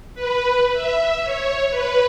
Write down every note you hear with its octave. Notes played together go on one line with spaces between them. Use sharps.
B4
E5
C#5
B4